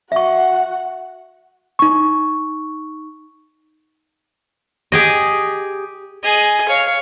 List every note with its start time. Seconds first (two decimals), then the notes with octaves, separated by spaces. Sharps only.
0.12 F#4 E5 F#5 C#6
1.79 D#4 C#6
4.92 G4 G#4 D#5
6.24 G#4 D#5
6.69 C#5 F5